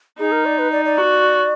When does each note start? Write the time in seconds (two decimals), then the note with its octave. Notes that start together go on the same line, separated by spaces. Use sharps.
0.19 D#4 G#4
0.32 A#4
0.46 D5
0.59 B4
0.72 D5
0.85 D5
0.98 F#4